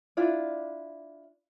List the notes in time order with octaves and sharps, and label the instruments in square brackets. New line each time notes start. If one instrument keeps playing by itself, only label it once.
[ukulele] D4 E4 F4 D5